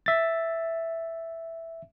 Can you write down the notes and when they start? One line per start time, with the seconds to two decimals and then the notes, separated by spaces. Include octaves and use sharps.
0.06 E5 A6